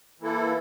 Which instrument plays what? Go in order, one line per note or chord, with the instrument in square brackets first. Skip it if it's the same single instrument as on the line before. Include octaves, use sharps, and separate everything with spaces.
[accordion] E3 A#3 E4 A4